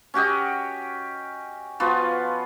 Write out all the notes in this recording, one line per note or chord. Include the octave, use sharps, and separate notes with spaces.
C#4 F#4 G4 D#5
F3 B3 F4 F#4